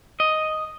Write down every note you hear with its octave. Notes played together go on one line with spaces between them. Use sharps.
D#5